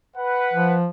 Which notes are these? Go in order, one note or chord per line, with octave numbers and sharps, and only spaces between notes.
B4 F#5
F3